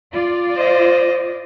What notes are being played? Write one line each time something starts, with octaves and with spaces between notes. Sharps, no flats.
F4 D5
C5 D#5